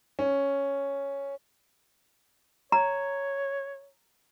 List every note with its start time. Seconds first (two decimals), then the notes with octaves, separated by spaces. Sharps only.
0.19 C#4
2.72 C#5 A#5